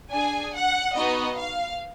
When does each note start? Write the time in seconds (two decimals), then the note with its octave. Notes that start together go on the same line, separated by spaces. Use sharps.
0.12 D4 G#4 G#5
0.53 F#5
0.96 B3 D#4 F#4 D#5
1.38 F5